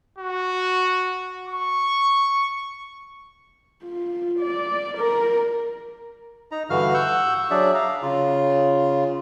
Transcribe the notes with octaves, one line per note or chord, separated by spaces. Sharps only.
F#4
C#6
F4
D5
A#4
D#4 A#5
G2 D3 E3 F#4 F5 F6
F#5 C#6 E6 G6
F#3 D4 G#4 D5 E5
F5 A#5
C#3 F4